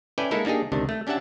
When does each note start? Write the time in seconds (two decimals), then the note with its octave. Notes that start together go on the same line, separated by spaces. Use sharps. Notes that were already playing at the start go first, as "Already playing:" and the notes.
0.18 C#4 E4 A4 B4 D5 G5
0.31 G#3 A#3 D#4 E4 A4 A#4
0.45 A#3 D4 D#4 G4 G#4
0.72 C#2 C3 D#3 D4
0.89 A3
1.07 C#4 D4 G4 E5 F#5 A5